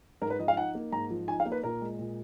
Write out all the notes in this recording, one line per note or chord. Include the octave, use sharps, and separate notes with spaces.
G#2 A#4
B4
F3 D#5
F5
D#4 F#5
A#3
G#2 A#5
F3
D#4 G#5
F5
A#3
B4
A#2 A#4
G#3
A#2